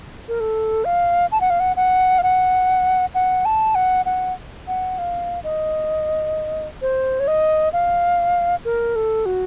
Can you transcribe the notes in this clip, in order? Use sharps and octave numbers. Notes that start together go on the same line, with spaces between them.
A#4
A4
F5
A5
F#5
F5
F#5
F#5
F5
F#5
F#5
A5
F#5
F#5
F#5
F5
D#5
C5
C#5
D#5
F5
A#4
A4
F#4